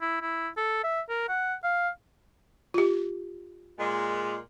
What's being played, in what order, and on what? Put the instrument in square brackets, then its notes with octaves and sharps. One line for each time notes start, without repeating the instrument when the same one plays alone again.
[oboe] E4
E4
A4
E5
A#4
F#5
F5
[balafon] F4 G4
[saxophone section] A#2 G#3